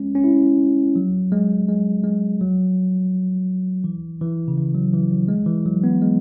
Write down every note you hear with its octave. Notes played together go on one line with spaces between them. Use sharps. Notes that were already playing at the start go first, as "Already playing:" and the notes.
Already playing: G#3 C#4
C#4
E4
F#3
G#3
G#3
G#3
F#3
E3
E3
C#3
E3
F#3
E3
F#3
G#3
E3
F#3
B3
G#3